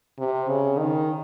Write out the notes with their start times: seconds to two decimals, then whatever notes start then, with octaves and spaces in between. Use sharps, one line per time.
0.19 C3
0.49 C#3
0.79 D#3